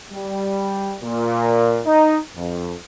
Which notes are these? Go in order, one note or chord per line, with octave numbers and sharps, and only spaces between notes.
G3
A#2
D#4
F2